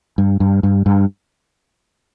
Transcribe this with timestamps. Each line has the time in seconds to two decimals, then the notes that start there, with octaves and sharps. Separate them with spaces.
0.18 G2
0.40 G2
0.63 G2
0.86 G2